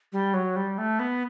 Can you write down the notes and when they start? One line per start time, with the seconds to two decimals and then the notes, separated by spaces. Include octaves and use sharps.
0.12 G3
0.33 F#3
0.56 G3
0.78 A3
0.99 B3